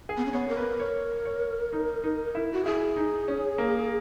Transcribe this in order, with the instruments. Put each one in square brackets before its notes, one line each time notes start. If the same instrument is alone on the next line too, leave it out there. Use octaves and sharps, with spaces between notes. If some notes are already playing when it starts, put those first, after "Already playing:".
[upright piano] G#4
[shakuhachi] B3
C#4
[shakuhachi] B3 [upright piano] C#5
[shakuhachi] A#4
[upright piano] B4
C#5
C#5
D#4
D#4
E4
[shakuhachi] F#4
[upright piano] E4 [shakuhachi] G#4
[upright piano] D#4
C#4
A#3